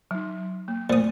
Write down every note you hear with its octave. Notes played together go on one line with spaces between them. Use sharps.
F#3 D#4
A#3
A#2 A3 C5 D#6